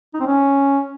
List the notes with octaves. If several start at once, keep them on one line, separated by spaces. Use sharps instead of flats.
D#4
C4
C#4